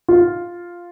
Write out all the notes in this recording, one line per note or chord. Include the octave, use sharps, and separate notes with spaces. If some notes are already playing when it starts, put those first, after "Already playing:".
F4